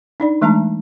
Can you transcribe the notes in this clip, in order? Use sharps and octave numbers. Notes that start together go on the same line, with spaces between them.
D4 D#4 D5
E3 G#3 A3 D4 A5 A#5